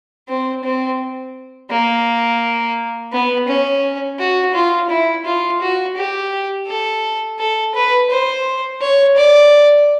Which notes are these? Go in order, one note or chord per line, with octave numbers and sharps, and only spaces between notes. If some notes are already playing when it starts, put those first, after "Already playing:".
C4
C4
A#3
B3
C#4
F#4
F4
E4
F4
F#4
G4
A4
A4
B4
C5
C#5
D5